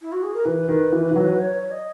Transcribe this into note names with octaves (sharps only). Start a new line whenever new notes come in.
E4
F#4
G#4
A#4
E3 B4
D#3
E3
E3
F#3
C#5
C#5
D#5